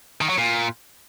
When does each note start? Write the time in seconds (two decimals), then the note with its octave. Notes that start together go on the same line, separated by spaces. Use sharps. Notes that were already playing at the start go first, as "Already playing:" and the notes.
0.21 D#3
0.29 F#3
0.38 A#2